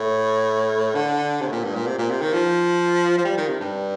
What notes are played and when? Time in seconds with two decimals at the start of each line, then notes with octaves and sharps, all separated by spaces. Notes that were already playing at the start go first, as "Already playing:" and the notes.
Already playing: A2
0.95 D3
1.41 C3
1.47 A2
1.52 A#2
1.64 G2
1.75 A#2
1.87 C3
1.98 A#2
2.11 C3
2.22 D#3
2.33 F3
3.18 F3
3.25 G3
3.37 D#3
3.49 C3
3.60 G2